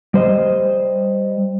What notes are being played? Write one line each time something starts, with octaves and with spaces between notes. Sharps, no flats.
G3 C5 D#5